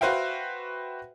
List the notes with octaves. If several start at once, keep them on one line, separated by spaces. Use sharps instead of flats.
F#4 B4 C5 E5 F5 G5